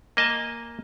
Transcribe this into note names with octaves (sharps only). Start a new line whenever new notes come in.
A#3 D#5 G#5 A5